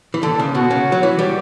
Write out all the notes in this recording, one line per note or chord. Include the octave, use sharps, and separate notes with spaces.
E3
D3 A4
C#3
B2 F#4
C#3
F#3
E3
G3